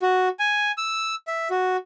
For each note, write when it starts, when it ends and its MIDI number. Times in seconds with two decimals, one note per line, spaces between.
0.02 0.29 66
0.39 0.72 80
0.78 1.15 88
1.27 1.48 76
1.51 1.77 66